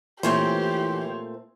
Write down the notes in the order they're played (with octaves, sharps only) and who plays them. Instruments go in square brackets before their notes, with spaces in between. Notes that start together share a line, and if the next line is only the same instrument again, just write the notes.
[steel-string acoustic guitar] A#2 A3 C4 [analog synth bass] E3 [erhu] G4 [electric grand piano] C5 C#5 C6